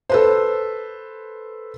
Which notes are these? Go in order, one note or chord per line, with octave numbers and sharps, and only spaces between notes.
A4 B4 C5